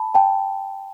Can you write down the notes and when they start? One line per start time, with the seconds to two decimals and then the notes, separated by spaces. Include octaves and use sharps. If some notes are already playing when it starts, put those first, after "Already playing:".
Already playing: A5 B5
0.14 G5 A5